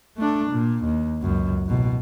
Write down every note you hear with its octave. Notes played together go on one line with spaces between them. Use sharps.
A3 D4
A#2
D#2
C#2 F#2
A1 B2